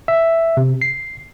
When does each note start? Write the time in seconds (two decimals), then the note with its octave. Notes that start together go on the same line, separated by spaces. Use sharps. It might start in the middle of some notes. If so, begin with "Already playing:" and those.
0.08 E5
0.57 C3
0.82 C7